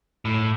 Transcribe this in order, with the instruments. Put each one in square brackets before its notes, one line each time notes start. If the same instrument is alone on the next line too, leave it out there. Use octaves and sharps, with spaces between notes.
[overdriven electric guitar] A2